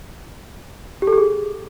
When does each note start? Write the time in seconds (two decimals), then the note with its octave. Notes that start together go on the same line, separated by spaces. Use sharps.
1.02 G4
1.07 A4
1.13 G4
1.18 G#4